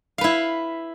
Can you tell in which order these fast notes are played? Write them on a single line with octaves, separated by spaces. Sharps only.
F5 B4 E4